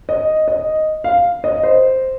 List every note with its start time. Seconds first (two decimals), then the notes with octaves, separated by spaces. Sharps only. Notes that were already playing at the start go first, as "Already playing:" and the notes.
0.09 D#5
0.48 D#5
1.04 F5
1.44 D#5
1.63 C5